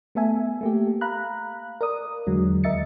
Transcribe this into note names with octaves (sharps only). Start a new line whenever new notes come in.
A3 B3 A4 E5 G#5
A3 A#3 G4
F5 A#5 B5 F#6
A#4 D5 D#6
E2 D3 F#3 G#3
D#2 A#4 D#5 E5 A6 C#7